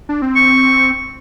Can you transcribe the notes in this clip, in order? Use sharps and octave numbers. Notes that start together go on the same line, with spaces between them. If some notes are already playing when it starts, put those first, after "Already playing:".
D4
C4
C#6